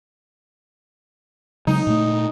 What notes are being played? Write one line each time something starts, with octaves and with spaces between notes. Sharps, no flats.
C#3 F#3 G#3 D#4
A#2 A3